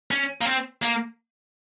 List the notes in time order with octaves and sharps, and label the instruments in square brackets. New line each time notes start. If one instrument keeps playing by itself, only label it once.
[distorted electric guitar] C#4
A#3
C4
A#3